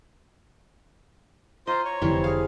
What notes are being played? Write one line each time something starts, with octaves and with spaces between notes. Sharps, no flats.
F4 C5 D#5 A#5
C#5
F1 D3 E3 F3 G3 C4
G#4 F5